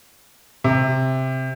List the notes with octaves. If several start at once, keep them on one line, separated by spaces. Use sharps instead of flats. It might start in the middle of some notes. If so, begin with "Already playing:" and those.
C3